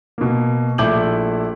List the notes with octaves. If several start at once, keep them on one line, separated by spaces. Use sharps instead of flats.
B2 A#3
A#1 A3 E4 D6 G6 F#7